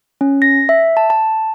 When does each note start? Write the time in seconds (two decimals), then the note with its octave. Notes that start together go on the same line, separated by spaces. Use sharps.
0.21 C#4
0.42 A#6
0.69 E5
0.97 A5
1.10 A5